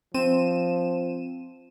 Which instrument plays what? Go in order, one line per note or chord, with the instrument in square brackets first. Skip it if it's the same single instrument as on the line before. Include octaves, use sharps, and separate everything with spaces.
[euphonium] F3 [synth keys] C4 D#7 E7